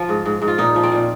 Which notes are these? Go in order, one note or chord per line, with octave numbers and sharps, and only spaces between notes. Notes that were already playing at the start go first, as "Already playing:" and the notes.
Already playing: F3 F4
G#2
G#2
G#2
F4
A#2 D#4
F3
C4
A#2